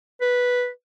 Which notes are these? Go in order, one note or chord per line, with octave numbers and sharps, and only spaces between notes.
B4